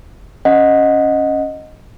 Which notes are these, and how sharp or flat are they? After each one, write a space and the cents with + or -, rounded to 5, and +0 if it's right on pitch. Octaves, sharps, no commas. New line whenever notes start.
C#4 +0 D#5 +0 F#5 -15